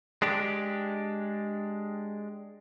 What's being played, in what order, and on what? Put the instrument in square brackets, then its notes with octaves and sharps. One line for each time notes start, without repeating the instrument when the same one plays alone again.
[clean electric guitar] G#3 D4 G4